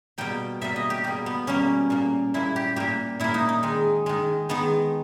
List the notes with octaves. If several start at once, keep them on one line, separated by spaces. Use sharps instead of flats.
B2 G3 A#3 G5
B2 G3 A#3 E5
D#5
G4
B2 G3 A#3 G4
B3
B2 G3 A#3 C#4
A#2 A#3
A#2 A#3 E4
G4
A#2 A#3 G4
A#2 A#3 E4
D#4
D#4
D#3 G#3
D#3 G#3
D#3 G#3 B3